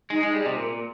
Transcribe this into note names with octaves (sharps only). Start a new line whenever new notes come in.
G#3 D#4
G#3
G3 G#4 D#5
C3
A#2 A#4